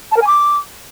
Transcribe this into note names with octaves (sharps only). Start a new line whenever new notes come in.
A5
A#4
G#5
D6